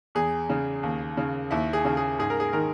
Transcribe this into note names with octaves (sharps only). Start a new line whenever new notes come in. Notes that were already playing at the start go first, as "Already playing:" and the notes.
E2 G#4
C#3
D#2
C#3
D#2 E4
G#4
C#3
G#4
G#2 G#4
A#4
G#4
D#3 A#4